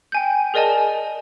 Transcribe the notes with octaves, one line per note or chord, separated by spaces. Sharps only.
G5 G#5 G6
G#4 A#4 D5 D#5 G#5 A5